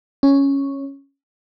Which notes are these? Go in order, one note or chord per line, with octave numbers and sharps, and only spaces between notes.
C#4